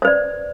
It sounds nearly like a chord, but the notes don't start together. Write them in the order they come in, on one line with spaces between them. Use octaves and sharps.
C5 B4 D5